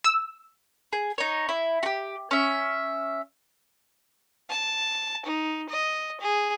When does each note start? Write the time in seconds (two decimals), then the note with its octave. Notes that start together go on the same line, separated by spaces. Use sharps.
0.04 E6
0.93 G#4
1.18 D#4 C#5
1.49 E4
1.83 F#4 G4
2.31 C#4 E5
4.50 A5
5.26 D#4
5.69 D#5
6.21 G#4